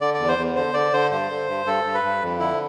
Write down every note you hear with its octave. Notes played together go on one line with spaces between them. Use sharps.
D3 D5
D5
E2
C5
E2
D3 C5
D3 D5
D3 C5
G2 C5
D3
G2
G2 A4
G2
B4
G2
F2
D3 E4